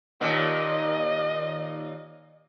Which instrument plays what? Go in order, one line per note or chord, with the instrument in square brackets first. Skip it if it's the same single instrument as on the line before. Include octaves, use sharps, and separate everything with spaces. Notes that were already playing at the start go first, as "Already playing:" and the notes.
[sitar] D#2 A#2 A#3 [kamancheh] D#5